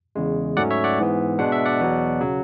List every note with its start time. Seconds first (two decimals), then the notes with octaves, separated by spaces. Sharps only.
0.16 E2 C#3 G#3
0.57 G#2 F#3 A3 C#4 D5 F#5
0.71 C#5 E5
0.84 D5 F#5
0.98 G#2 E3 B3
1.39 B2 G#3 D4 F#5
1.52 E5
1.65 D5 F#5
1.80 E2 B2 F#3
2.21 C#3 F#3